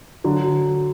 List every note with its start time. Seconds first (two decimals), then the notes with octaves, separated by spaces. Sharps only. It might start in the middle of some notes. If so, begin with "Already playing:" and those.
0.24 D3 F#3